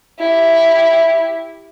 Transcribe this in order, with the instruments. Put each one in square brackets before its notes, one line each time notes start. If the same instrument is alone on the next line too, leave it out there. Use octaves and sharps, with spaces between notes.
[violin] E4 G4